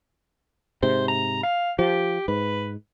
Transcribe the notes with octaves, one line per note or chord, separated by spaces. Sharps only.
G#2 C3 C5
A#5
F5
F3 G4
G#2 B4